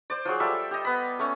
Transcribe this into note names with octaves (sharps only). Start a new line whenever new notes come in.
C5 D5
F3 F#3 G#4
G3 F4 A4 E5
G4 D#5
B3 B5
A3 C#4